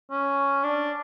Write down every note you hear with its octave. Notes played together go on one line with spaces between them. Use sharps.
C#4
D4